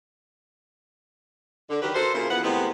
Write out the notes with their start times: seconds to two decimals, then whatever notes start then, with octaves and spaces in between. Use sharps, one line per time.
1.70 D3
1.82 D#3 F#3 G4 B4
1.95 F#4 A4 A#4 C5
2.14 C#3 A#3 E4 F4 G#4 C5
2.30 E2 F3 B3 B4 F#5
2.43 A2 C3 D#3 G#3 B3 C4